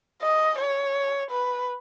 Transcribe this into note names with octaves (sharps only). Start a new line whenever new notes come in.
D#5
C#5
B4